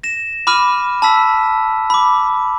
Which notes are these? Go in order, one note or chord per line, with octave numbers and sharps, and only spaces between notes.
A#6 E7
B5 D6 F6 D#7
A5 B5 E6 B6
B5 D6